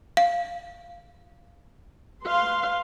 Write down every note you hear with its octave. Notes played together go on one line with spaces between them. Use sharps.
F5
B4 F5 C6